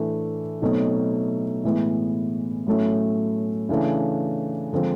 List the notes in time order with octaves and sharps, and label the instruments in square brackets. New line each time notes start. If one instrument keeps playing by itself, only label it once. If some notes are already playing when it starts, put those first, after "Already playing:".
Already playing: [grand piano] A2 E3 A3 D4
B2 F#3 A3 C4 D#4
A2 E3 G#3 B3
A2 F#3 A3 C#4 E4
C#3 E3 A3 D4
D3 F3 G#3 C4